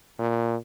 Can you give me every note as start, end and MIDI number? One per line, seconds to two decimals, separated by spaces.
0.19 0.56 46